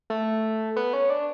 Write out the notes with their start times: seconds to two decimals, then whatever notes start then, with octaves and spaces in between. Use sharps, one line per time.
0.10 A3
0.76 B3
0.93 C#4
1.10 D4